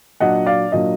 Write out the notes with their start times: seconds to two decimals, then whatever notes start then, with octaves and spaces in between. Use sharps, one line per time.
0.20 A#2 F#3 D4 D#5 F#5
0.46 D5 F5
0.72 A#2 F#3 D4 D#5